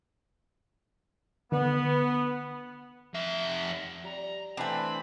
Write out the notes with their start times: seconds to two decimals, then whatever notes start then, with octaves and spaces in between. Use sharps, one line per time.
1.52 D3 B3
3.14 F2 E5
4.04 G3 A#5
4.57 E3 A3 C4 D4 G#5 B5